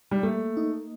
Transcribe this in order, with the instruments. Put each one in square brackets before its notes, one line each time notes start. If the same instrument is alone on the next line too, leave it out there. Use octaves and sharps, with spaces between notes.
[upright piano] G3
[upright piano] A3 [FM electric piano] A#3
[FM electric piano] D#4